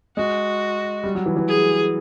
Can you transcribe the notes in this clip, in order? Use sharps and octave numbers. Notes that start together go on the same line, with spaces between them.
G#3 F#4
G3
F#3
E3
E3
G#4